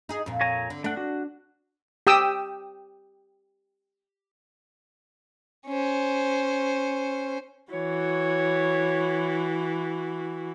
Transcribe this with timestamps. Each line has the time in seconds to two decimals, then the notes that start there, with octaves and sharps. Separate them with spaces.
0.09 D#4 G#4
0.26 F2 A#2
0.41 C#5 G#5 A#5
0.70 D3
0.84 A3 D4 F#5
0.97 F#4
2.07 G4 G5 D#6 E6
5.67 C#4 C5
7.73 E3 F#4 C#5